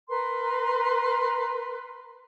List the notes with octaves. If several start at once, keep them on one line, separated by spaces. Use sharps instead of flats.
A#4 B4 C6